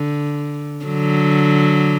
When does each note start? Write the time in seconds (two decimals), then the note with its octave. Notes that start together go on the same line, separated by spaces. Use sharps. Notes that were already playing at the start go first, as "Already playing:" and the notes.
Already playing: D3
0.85 D3 F#3